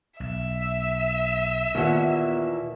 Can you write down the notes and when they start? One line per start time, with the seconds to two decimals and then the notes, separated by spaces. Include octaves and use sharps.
0.20 B1 E5
1.75 D#2 A#2 E3 B3 F#5